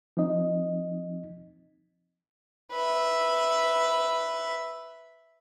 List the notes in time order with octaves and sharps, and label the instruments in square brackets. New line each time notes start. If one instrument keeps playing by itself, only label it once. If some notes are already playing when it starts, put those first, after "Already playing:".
[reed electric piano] F3 C4 D#4 D#5
[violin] B4 E5